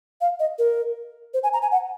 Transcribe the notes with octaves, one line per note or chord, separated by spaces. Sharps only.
F5
D#5
A#4
C5
G#5
A#5
G#5
F#5